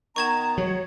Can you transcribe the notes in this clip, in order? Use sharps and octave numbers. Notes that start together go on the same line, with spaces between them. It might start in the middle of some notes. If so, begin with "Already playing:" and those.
D#3 B3 A#5 C#6 G#6 E7
F#3 C#5